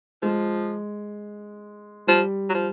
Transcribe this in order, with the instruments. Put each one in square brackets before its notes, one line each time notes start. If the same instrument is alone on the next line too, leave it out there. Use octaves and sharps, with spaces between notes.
[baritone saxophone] F3 [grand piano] G#3
[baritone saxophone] F3 [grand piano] G3
[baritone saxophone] F#3
F3